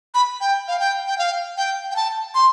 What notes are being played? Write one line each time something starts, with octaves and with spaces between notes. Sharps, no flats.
B5
G5
F5
G5
G5
F5
G5
G5
A5
C6